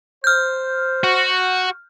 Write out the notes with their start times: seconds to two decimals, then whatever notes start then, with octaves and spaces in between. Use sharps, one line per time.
0.24 C5 F6 G6
1.04 F#4